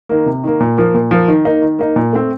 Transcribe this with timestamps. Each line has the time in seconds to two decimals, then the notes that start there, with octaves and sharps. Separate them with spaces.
0.09 D#3 A#3
0.26 C3
0.43 D#3 A#3
0.60 A#2
0.77 F3 A#3
0.94 A#2
1.11 F3 A#3
1.28 D#3
1.45 A#3 D#4
1.62 D#3
1.79 A#3 D#4
1.96 A#2
2.13 A3 C4